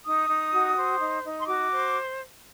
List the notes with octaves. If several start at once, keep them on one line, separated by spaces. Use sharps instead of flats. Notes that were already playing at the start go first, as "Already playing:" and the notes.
D#4 D#6
D#4
F#4
C5
D#4
D#4
C6
F#4 D6
C5